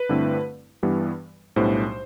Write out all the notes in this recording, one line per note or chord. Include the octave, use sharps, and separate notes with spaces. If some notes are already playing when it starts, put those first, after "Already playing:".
Already playing: B4
G2 D3 A3 C4 E4
G2 E3 G3 B3
B1 A2 G3 B3 D4 C5